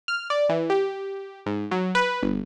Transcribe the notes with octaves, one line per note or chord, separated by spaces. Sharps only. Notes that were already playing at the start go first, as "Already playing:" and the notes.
F6
D5
E3
G4
G#2
F#3
B4
G1